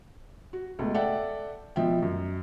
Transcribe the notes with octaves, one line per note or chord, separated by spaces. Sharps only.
F#4
C#2 B2 A3
A4 D5 E5 F#5 G5
B2 F3 E5 G5
F#2